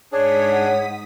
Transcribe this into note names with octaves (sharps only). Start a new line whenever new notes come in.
G#2 D4 G#4 C#5 D#6 B6
F#5